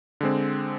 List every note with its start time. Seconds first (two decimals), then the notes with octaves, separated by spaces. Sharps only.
0.21 D3 G#3 C4